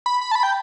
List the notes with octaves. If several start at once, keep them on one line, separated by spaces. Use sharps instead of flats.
B5
B5
A5
B5
G5